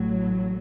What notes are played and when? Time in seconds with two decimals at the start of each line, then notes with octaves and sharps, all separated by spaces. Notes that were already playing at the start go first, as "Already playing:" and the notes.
Already playing: A1 A2 F#3